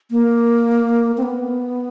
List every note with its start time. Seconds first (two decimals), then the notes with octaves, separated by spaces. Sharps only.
0.11 A#3
1.17 C4
1.23 B3